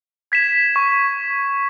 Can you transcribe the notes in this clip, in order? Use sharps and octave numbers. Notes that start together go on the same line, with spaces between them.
G#6 B6 E7
C#6